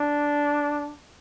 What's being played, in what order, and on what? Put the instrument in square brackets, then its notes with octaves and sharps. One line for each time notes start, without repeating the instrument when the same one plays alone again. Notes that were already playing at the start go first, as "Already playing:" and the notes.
Already playing: [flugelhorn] D4